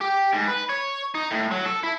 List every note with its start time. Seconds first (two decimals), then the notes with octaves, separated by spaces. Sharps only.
0.01 G4
0.33 G#2
0.47 B4
0.69 C#5
1.15 D#4
1.31 A2
1.51 F#3
1.65 A4
1.83 E4